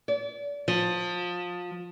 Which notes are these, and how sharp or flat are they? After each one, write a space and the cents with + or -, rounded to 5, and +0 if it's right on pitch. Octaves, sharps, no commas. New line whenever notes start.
D5 -35
F3 +25